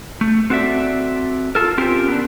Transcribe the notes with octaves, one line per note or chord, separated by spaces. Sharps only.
A3
C4 F#4 A4 D5 E5
F4 A4 A#4
C4 C#4 F4 G4 A#4 C5
B3 D4